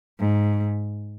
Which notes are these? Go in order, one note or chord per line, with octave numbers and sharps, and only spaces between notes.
G#2